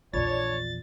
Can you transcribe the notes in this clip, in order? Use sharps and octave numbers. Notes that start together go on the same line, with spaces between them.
A#1 E2 D4 F4 C#5 D5 A6